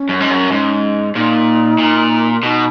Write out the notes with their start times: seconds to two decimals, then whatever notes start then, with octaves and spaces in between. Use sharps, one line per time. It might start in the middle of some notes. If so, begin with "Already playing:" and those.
Already playing: C#4
0.09 F#2
0.20 G#2
0.30 F#2
0.52 G#2
1.15 A#2 D#4
1.79 A#2
2.43 B2 D#4